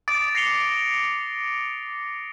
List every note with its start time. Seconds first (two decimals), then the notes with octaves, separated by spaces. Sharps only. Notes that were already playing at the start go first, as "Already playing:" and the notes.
0.08 D6 D#6 A6 D7
0.35 A#6 C7 C#7 F7 G7